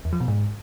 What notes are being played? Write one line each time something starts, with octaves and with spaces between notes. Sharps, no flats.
E2
F3
B2
G#2